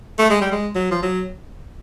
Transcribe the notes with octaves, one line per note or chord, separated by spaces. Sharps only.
A3
G#3
G3
G#3
F#3
F3
F#3